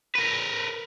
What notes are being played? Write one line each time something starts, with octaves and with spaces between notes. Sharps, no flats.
A#4 B4